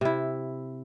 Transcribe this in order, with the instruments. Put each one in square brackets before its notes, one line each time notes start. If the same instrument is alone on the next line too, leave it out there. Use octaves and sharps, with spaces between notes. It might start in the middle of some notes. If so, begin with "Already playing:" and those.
[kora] C3 E4